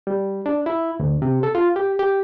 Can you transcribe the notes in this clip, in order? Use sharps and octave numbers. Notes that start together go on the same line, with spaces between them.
G3
D4
E4
D2
C3
A4
F4
G4
G4